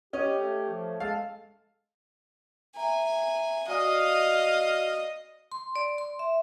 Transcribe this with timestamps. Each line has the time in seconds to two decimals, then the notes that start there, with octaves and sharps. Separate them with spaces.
0.13 C#4 G4 D#5
0.39 A3
0.70 F3
1.00 G#3 A4 F5
2.76 E5 G#5 A#5
3.68 F#4 D5 D#5 F5 D#6
5.52 C6
5.76 D5
5.98 C6
6.19 E5